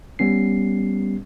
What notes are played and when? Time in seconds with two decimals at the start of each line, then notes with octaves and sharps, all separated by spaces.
0.19 G3 B3 C#4 C7